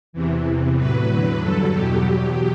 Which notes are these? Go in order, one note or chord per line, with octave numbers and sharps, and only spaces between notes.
E2 C3 E3
E2 C3 E3
A2 F#3 B4
E2 D3 F#3
G2 D3 F#3 A4
E2 B2 F#3 G4
E2 B2 F#3